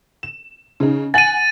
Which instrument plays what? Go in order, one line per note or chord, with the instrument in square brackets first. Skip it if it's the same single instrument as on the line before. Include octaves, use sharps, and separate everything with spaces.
[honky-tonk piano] E7
C#3 D#4
[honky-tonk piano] F#5 G#5 F#7 [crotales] A6 D#7